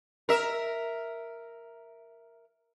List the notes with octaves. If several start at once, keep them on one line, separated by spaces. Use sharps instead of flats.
A#4 E5